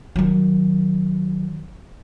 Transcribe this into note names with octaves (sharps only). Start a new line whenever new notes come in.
D#3 F#3